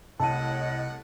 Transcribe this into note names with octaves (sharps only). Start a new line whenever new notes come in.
C2 A2 A4 D#5 F#5 D#7